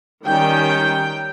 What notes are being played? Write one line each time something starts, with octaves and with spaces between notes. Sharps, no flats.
D#3 G3 C#4 G5